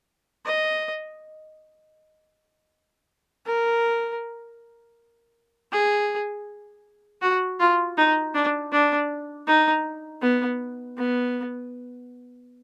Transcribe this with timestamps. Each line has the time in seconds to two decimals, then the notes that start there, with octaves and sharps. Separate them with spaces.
0.45 D#5
3.46 A#4
5.72 G#4
7.22 F#4
7.60 F4
7.98 D#4
8.35 D4
8.72 D4
9.47 D#4
10.22 B3
10.98 B3